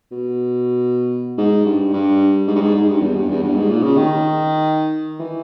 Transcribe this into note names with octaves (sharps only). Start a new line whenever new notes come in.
B2
G#2
G2
G2
G#2
G2
G#2
G#2
G2
E2
G2
E2
G2
G#2
A#2
C#3
D#3
E3